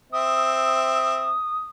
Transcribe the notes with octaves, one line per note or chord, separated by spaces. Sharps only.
C4 E5 D#6